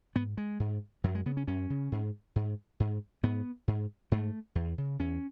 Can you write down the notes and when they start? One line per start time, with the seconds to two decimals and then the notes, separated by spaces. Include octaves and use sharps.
0.16 G#2 B3
0.37 G#3
0.60 G#2
1.04 F#2 F#3
1.15 G#3
1.26 C#3 B3
1.37 C#4
1.47 F#2 C#4
1.70 C#3
1.92 G#2
2.36 G#2
2.80 G#2
3.23 G#2 B3
3.68 G#2
4.12 G#2 A3
4.55 E2
4.78 C#3
4.99 E2 C#4